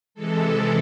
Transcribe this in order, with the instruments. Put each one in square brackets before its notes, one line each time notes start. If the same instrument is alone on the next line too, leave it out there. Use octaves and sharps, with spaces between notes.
[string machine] C3 E3 G#3 A4